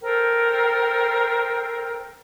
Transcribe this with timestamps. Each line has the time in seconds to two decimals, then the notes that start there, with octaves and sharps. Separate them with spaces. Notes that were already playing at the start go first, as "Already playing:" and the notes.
0.01 A4 A#4 C5 G5